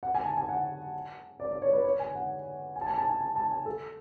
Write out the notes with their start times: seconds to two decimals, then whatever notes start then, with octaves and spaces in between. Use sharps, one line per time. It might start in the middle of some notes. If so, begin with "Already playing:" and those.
0.03 F#5
0.14 G#5
0.25 A5
0.37 G#5
0.49 F#5
1.40 D5
1.51 D5
1.62 C#5
1.73 B4
1.84 C#5
1.99 G#5
2.15 F#5
2.76 G#5
2.81 A5
2.87 G#5
2.98 A5
3.09 G#5
3.21 A5
3.36 A5
3.51 G#5
3.66 A4